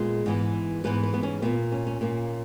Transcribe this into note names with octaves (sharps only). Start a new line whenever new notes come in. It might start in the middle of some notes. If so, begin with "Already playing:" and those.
Already playing: A#2 G#3 B3
G#2 E3 B3
G#2 E3 B3 B4
B4
B3
C#4
A#2 A#3 B3
C#4
C#4
A#2 A#3